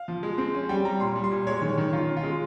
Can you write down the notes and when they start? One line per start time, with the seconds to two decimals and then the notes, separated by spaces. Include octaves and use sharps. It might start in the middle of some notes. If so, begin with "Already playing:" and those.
Already playing: F5
0.08 F3
0.23 G#3
0.38 C4
0.55 C#4
0.69 G3 G5
0.84 G3 A#5
1.00 A#2 C6
1.16 G3
1.24 C6
1.31 A#2
1.47 G#3 C#5
1.62 D#3
1.70 C#5
1.78 D#3
1.93 D#3 F4
2.09 C#4
2.17 F4
2.24 G#3